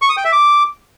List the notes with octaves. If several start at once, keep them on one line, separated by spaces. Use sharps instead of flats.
C#6
D#6
G5
E5
D6